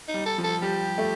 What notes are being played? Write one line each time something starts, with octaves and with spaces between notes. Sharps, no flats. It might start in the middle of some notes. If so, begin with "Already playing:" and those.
D#4
G3
A4
F3
A4
G3 G4
A3